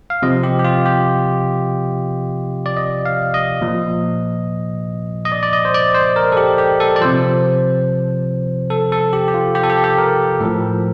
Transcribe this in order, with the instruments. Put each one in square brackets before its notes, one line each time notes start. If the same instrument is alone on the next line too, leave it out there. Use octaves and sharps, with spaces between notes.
[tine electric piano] F5
C3 F3 D#5
G4
G4
F4
G4
D5
D#5
F5
D#5
A#2 F3
D#5
D5
D5
D#5
C5
D5
C5
A#4
A4
G4
G4
A4
D5
C3 F3 C5
A4
A4
G4
G4
F4
G4
A4
G4
A4
G4
A#4
A2 F3